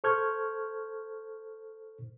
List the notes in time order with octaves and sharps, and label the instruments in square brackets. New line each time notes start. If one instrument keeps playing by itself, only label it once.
[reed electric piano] A4 C5 C#6 F6 G6 G#6